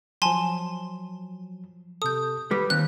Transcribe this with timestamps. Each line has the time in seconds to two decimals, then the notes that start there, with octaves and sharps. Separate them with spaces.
0.22 F3 F#3 G#5 A5 C6
2.02 C3 A4 D#6 G6
2.51 G3 B4 D6
2.70 D#2 C4 F#6